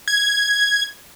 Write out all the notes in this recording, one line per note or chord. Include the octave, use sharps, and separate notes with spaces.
G#6